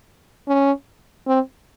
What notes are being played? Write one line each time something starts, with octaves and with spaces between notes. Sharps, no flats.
C#4
C4